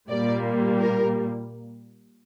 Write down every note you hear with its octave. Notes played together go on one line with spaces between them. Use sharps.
A#2 G3 A#3 D5
A#4